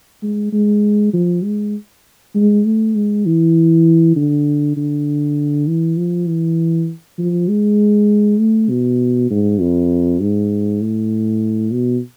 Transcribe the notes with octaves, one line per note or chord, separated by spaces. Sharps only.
G#3
G#3
F3
G#3
G#3
A3
G#3
E3
D3
D3
E3
F3
E3
F3
G#3
A3
B2
G#2
F2
G#2
A2
B2